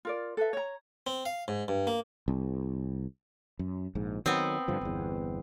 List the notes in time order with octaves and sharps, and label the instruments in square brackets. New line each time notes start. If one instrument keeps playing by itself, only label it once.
[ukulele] F4 A#4 D5
A4 B4 E5
C#5 A#5
[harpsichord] C4
F5
G#2
G2
A#3
[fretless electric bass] C2
F#2
A#1 G#2
[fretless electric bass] D#3 F#3 [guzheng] B3 C4
[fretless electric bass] G2 D3 F3
G1 E2